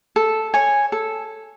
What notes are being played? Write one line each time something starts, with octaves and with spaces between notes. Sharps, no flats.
A4
C#5 G#5
A4